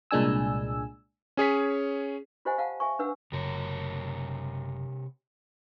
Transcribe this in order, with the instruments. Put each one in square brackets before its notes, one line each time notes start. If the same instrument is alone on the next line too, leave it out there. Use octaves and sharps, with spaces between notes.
[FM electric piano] C2 A#2 G#3 D4 G#5 E6
[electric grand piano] C#4 G#4 C#5 B6
[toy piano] F4 G4 C5 D#5 F#5 G#5
F5 F#5 A5
E5 G#5 C#6
D4 B4 F#5 E6
[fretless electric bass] F#1 [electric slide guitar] C3 A#4 C#5